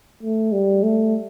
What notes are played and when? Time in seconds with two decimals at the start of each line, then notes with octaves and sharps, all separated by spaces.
0.23 A3
0.53 G3
0.83 A3